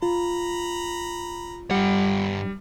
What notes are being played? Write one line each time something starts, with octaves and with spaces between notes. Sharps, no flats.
F4 A#5 B5
G2 G3 F#5